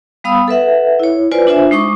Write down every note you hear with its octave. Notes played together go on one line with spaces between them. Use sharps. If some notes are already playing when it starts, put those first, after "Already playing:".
G3 B3 F5 B5 D#6 E6
A4 B4 E5 F#5
E4 C#5
F4 B4 C5 D5 G#5
D4 F4 C5 E5 G#5
G#3 D#4 C#6 D6